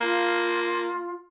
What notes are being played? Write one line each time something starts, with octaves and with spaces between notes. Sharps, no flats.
A#3 F4